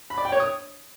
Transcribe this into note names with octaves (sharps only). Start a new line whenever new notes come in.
B5
D5
G5
C#5
D#6